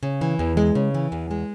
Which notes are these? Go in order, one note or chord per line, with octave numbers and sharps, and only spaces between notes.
C#3
E3
E2
G#3
C#3
E3
E2
G#3